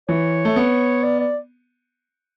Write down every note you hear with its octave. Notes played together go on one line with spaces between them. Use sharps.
E3 C#5
A3
B3
D5
D5